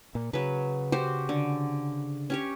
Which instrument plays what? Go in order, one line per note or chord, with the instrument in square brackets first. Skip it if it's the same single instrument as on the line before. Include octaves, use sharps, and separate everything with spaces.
[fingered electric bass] A#2
[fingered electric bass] C#3 [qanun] F#3 B4
[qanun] F#4 G4 C5
D3
C#4 G4 C#5